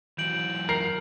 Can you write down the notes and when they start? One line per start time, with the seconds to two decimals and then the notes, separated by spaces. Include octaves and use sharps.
0.18 E3 F#3 G6 D7 F#7
0.69 A#4 C7